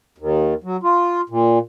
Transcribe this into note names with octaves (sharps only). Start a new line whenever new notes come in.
D#2
F#3
F4
A#2